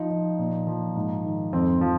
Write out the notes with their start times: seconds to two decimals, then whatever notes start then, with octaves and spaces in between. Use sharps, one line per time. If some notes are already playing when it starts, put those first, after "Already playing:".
Already playing: F3 D#4
0.11 F3
0.38 A#2
0.67 F3
0.96 G#2
1.24 D#3
1.53 F2 C4
1.81 F3